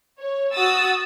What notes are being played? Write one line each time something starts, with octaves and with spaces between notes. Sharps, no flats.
C#5
F#4 D#6 E6 A6